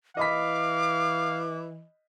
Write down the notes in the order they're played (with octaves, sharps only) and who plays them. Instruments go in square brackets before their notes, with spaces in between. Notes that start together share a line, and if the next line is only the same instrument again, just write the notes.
[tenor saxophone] E3 [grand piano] D#5 B5 B6 [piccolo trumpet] F5 [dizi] D6